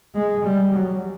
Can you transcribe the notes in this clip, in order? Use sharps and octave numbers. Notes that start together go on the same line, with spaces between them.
G#3
G3
F#3